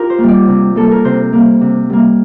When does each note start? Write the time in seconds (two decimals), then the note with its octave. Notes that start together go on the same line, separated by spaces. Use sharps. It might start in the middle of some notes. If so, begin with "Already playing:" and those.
Already playing: F4 G4 A#4
0.10 C5
0.18 A#3
0.23 G3
0.29 D5
0.47 C3
0.75 G3 A#3 A4
0.91 A#4
1.04 C3 C5
1.33 G3 A#3
1.61 C3
1.90 G3 A#3